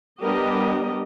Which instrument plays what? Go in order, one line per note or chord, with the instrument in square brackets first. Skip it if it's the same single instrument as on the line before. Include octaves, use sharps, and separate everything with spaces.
[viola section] G3 B3 D4 G4 A#4 D#5